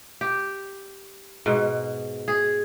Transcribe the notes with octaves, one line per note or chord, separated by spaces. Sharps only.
G4
G#2 B2
G#4